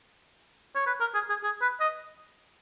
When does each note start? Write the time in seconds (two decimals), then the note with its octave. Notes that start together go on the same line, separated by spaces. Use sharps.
0.75 C#5
0.87 B4
1.00 A#4
1.14 G#4
1.29 G#4
1.44 G#4
1.62 B4
1.80 D#5